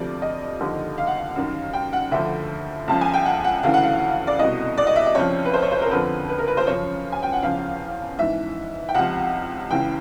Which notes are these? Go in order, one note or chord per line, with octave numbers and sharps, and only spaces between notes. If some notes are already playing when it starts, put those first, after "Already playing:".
Already playing: D2 C3 F3 D5
D#5
D#2 D3 F3
F5
F#5
F5
F#2 D#3
G5
F#5
D2 D3 F3 E5
C#2 C#3 F3 A5
G#5
G5
F#5
F#5
D2 C#3 E3 F5
F#5
F5
D5
C2 B2 D#5
D5
D#5
E5
D#5
F2 C#3 F3 C#5
B4
C5
C#5
C5
A#4
F2 D3 F3 B4
B4
A#4
B4
C5
F#2 C#3 F3 C#5
G#5
G5
F#5
E2 C#3 F3 F5
G#2 E3 E5
G5
C#2 C3 F3 F#5
C#2 C#3 E3 G5